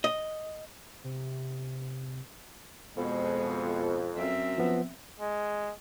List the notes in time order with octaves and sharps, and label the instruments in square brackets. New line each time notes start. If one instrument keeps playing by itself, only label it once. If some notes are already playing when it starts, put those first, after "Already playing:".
[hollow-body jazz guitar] D#5
[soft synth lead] C3
[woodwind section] F2 [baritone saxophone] B2 [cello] G#3
[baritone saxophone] F#2 [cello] C4 E5
[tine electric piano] F3 B3
[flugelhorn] G#3